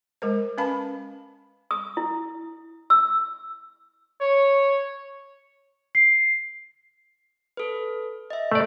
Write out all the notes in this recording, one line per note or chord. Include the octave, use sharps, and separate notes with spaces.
G#3 A#4 C5
C#4 B4 F5 A5 B5
D#6
E4
E6
C#5
C7
A4 B4
D#5 E5
A3 D5